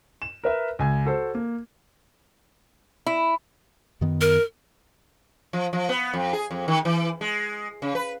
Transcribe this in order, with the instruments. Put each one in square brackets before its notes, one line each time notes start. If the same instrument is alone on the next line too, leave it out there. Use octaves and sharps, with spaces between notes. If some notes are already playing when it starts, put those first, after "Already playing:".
[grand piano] E7
A#4 B4 E5
C#2 G#5 G#6
F#4 A4 C5
A#3
[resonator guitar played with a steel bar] E4
[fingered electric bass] F#2 D#3 B3
[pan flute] A#4
[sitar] F3
F3
B3
F2
G#4
F2
D#3
E3
G#3
C#3
B4